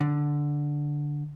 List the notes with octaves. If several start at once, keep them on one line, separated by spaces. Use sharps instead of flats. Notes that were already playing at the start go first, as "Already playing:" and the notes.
D3